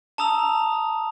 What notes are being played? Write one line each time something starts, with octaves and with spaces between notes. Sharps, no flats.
A5 A#5 D#6 E6 F7